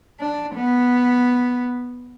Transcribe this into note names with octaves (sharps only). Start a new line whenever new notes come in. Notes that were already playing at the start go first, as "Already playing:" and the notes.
D4
B3